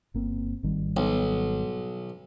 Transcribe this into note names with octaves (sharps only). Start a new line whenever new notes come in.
G1 A#3 C4
G#1 D#3 G3
B1